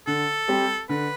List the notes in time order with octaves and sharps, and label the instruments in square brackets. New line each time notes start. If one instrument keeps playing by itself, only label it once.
[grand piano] D3 [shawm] A4
[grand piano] G3 C4 G4
[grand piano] D3 [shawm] B4